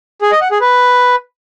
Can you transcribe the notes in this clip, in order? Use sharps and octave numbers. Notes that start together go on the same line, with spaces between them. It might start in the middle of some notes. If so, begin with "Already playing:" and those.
G#4
D#5
F#5
G#4
B4